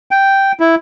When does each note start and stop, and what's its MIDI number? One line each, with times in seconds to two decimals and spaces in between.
0.11 0.52 79
0.60 0.75 64